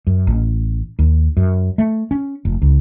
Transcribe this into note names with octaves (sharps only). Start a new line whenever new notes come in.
F#2
A1
D#2
F#2
A3
C#4
F1
C#2